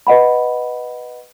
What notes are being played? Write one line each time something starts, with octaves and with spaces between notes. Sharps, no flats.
B4 D#5 F#5 B5